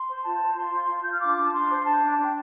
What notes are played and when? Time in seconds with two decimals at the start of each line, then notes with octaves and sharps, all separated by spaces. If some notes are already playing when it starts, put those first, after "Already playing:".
Already playing: C6
0.09 C5
0.24 F4 A5
0.41 C5
0.57 F4 C6
0.73 F4
0.89 F4
1.02 F4 G6
1.12 F6
1.21 D4 D6
1.37 D4 A5
1.53 D4 C6
1.70 C5
1.86 D4 A5
2.02 D4
2.18 D4
2.24 G5